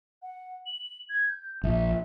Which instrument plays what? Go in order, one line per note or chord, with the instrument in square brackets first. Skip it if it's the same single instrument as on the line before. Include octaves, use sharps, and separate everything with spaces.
[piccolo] F#5
F#7
G#6
G6
[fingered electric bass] A#1 [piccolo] E5